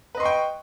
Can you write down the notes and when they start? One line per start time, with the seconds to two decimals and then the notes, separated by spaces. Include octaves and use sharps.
0.15 B4
0.17 D#5
0.20 C6
0.23 C#6
0.25 G5